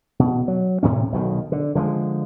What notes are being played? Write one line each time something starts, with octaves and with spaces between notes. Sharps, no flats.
B2
F#3
A2 C3 C#4
B1 B2 D#3
D3
D3 F3 F#3 G#3